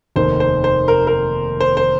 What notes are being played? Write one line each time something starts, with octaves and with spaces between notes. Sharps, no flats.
F1 D#2 D#3 C5
C5
C5
A#4
A#4
C5
C5